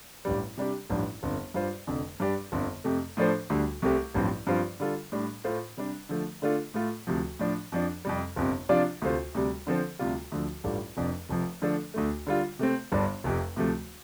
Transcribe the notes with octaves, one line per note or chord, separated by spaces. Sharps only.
A1 G2 G3
C3 G3 D4 G4
A1 G2 F3 D4
G1 F2 D3
G2 G3 F4 C5
F1 F2 D3
G2 G3 D4 G4 D5
G1 F2 D3
F2 C3 A3
A2 F3 D4 A4 C5
D2 D3 G3
C2 C3 A3 C4 G4
A1 G2 F3 C4
G2 F3 C4 F4 C5
D3 G3 F4 A4
A2 G3 D4
A2 A3 F4 C5
C3 G3 D4
D3 F3 A3
D3 A3 D4 F4 A4
A2 A3 F4 A4
D2 C3 F3
A2 F3 D4
F2 F3 D4
F2 C3 G3
G1 F2 C3
C3 F3 D4 F4 D5
D2 C3 A3 F4 C5
D2 C3 G3
D3 F3 C4 A4 C5
D2 C3 G3 F4
D2 D3 F3
A1 G2 G3 F4 A4
F1 F2 F3 D4
F1 F2 F3
D3 F3 A3 D4 A4
D2 D3 A3
D3 G3 F4
C3 A3 C4
G1 G2 G3 D4
F1 F2 C3
D2 C3 F3 A3